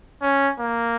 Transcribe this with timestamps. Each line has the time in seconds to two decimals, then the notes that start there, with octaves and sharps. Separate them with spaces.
0.22 C#4
0.60 A#3